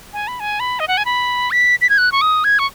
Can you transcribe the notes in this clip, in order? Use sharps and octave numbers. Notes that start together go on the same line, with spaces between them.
G#5
B5
G#5
B5
D#5
F#5
G#5
B5
B6
B6
G#6
F#6
C#6
D#6
G#6
C#6